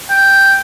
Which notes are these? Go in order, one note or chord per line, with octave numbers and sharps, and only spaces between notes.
G5